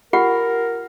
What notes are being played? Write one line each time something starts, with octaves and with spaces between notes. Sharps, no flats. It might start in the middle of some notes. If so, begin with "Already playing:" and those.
F4 G4 A#4 F#5